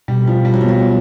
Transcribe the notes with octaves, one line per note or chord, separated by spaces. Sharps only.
B2 G3
F3
B2
G3
F#3
F3
F#3 B3